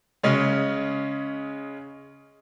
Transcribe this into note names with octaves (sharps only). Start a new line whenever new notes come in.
C#3 G#3 C#4